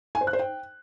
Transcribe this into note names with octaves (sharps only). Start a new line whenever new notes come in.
G#5
C5
F#6
C5
G5